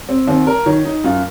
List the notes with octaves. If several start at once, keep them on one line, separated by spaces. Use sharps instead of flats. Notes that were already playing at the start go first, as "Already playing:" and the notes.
C4
D#2 C4
A#4
D#3 C#5
D#4
F#2 F4